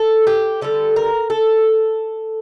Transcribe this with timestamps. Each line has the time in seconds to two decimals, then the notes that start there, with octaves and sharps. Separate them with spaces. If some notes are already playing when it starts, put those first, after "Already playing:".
Already playing: A4
0.27 G4
0.61 D3 G3 A4
0.96 A#4
1.30 A4